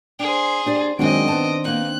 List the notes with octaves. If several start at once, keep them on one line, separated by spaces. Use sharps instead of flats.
D4 G#4 C5
D4 G4 D5
F#2 D#3 G#3 C4 D4 F#4 D#5 D7
B3 C5 A5
A#3 B3 D#4 F#6